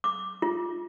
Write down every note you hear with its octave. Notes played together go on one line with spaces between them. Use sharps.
D6
F4